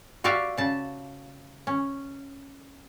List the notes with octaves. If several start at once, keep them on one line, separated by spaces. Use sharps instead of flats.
F#4 G4 D5 E5 F5
C#3 A5
C#4